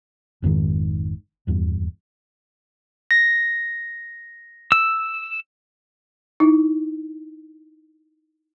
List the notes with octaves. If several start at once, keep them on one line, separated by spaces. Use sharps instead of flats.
G#1 F2 G#2 D#3
D#1 E2 G2
A#6
E6
D#4 E4